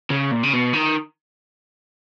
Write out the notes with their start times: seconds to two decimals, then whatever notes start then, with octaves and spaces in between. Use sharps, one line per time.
0.10 C#3
0.31 A#2
0.43 C#3
0.53 B2
0.74 D#3